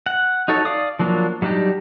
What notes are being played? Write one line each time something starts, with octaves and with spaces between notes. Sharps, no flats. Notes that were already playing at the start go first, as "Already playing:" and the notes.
F#5
D#4 F#4 A4 C#5
D5 F5 D6 D#6
F3 F#3 A#3 D4
F#3 G3 D4 D#4 G4